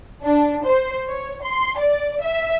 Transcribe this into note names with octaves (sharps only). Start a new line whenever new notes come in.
D4
C5
C#5
C6
D5
E5